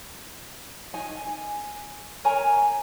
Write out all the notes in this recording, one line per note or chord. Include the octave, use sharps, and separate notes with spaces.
D#4 G#5
G#5
A#4 C#5 G#5 A#5